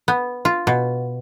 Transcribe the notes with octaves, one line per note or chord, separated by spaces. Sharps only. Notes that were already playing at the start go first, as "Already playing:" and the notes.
B3
F4
B2